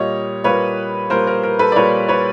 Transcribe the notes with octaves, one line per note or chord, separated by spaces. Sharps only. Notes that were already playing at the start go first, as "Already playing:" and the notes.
Already playing: A#2 G3 A#3 C#5 D#5
A#2 G3 A#3 B4 C#5
A#2 G3 A#3 A#4 C5
A#4
A#4
A4 B4
D5
A#2 G3 A#3 B4 C#5
B4 C#5